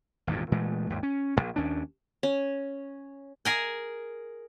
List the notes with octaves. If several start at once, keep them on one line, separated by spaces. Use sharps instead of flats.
G#1 E2 G2 A#2
A#2 E3 G#3 A3
D#2 G#2
C#4
E1 A#1
D#2 C#4 D4
C#4
G#4 A#4 G#5